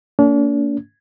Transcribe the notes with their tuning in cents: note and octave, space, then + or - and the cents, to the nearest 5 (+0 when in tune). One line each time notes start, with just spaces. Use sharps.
A#3 -30 D4 -45